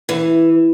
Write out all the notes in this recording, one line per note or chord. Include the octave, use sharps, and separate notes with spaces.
E3